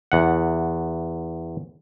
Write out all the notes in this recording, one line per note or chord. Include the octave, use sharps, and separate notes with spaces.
E2 F#5